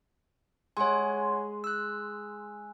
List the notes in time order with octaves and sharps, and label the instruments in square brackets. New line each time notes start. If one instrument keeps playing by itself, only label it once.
[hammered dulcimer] G#3 [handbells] C#5 F#5 G#5
[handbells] E6 F#6